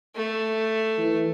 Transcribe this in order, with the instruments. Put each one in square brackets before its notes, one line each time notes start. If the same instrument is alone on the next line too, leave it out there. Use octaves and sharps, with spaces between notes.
[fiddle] A3
[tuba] E3